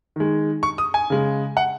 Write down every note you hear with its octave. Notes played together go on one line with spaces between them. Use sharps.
D#3 G#3
C#6
D#6
G#5
C#3 G#3
F#5